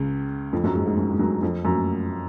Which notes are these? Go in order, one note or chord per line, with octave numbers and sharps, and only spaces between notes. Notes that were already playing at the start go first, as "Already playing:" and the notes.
Already playing: C#2 C#3
F2 F3
F#2 F#3
G#2 G#3
G#2 G#3
F#2 F#3
G#3
F#2 F#3
F2 F3
F#2 F#3